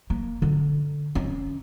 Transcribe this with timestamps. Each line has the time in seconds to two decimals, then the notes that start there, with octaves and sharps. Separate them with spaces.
0.10 A#3
0.42 D3
1.15 C#4